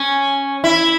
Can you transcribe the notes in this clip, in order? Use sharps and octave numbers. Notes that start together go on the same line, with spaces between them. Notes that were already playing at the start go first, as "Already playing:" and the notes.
Already playing: C#4
E4